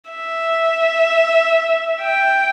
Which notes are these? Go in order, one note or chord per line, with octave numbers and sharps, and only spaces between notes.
E5
G5